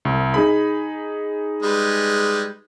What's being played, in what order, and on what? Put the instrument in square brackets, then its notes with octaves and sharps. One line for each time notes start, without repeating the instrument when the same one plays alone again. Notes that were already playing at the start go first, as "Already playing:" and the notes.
[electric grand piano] C2
D#4 G#4 B5
[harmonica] G3 G#3 B4